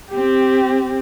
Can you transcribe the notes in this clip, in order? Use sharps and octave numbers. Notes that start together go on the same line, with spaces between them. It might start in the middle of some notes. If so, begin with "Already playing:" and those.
C4 G4